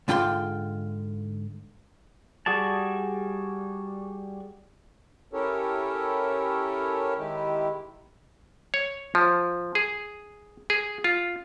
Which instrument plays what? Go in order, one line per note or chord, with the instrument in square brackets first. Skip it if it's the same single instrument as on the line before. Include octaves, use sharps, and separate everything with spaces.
[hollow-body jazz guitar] G#2 D3 F4 G5 B5 C6
[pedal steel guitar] G3 F#4 G#4 D5 A5
[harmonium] C#4 E4 G4 A4 A#4 C#5
D#3 G#3 E4 G4
[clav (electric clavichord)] C#5
F3
G#4
G#4
F4